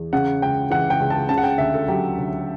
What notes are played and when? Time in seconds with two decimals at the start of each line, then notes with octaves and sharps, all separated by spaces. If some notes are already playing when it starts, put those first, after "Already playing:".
Already playing: E2
0.13 C#3 F#5
0.42 C#2 G5
0.70 E3 F#5
0.90 G5
1.00 C#2
1.10 A5
1.29 C#3 A5
1.38 F#5
1.43 G5
1.58 D2 E5
1.74 A4
1.88 F#3 G4
2.18 D2